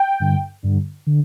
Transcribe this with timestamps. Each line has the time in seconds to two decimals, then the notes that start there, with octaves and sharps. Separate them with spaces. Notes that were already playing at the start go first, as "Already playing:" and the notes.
Already playing: G5
0.20 G2 D3
0.63 G2 D3
1.07 D3